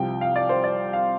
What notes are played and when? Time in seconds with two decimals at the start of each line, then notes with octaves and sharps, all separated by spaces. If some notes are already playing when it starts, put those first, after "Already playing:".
Already playing: C2 C3 F3 G5
0.21 F5
0.36 D5
0.49 C5
0.64 D5
0.93 F5